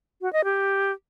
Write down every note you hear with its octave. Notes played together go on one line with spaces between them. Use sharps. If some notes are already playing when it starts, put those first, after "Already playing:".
F#4
D#5
G4